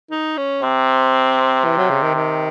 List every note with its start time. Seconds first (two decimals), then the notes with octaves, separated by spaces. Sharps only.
0.11 D#4
0.37 C#4
0.63 C3 C4
1.64 E3
1.77 F#3
1.90 C#3
2.02 D#3
2.14 D#3